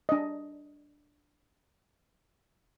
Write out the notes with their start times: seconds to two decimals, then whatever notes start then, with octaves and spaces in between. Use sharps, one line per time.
0.09 D4 D#5